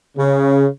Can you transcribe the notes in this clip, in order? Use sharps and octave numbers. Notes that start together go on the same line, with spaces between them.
C#3